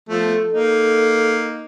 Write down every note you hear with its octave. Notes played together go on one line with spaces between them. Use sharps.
F3 A3 B3
A4
A#3 D#4